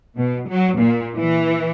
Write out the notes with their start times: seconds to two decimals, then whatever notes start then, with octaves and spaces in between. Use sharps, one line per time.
0.17 B2
0.49 F#3
0.80 A#2
1.17 E3